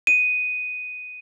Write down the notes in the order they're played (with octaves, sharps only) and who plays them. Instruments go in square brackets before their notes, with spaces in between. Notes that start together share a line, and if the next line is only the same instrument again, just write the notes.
[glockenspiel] D#7